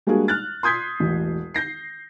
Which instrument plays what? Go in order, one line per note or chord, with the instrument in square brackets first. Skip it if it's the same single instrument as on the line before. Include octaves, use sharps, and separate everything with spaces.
[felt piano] G3 G#3 A#3 D4 F#4 G#4
F6 F#6 A6
C6 D#6 G6 G#6 B6 C7
E1 A1
G6 A#6 C7